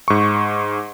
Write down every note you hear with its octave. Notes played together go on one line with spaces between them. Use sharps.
G#2 C#6